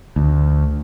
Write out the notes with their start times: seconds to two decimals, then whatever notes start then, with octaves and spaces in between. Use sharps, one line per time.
0.16 D2